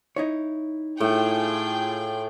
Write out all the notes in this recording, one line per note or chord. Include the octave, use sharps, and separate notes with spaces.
D#4 E4 C#5
A2 F4 G#4 G5